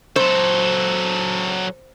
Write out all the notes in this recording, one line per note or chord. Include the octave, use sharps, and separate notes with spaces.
F#3 A4 C5